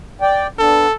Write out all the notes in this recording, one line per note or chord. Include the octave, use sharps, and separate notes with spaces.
D5 G5
B3 D4 A4